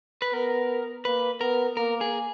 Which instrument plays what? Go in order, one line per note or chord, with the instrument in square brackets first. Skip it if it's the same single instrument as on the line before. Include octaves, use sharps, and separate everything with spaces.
[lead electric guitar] B4
[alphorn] B3 [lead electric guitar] A#4
[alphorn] A#3 [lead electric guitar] B4
[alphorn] B3 [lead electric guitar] A#4
[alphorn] A#3 [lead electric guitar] A#4
[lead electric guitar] G#4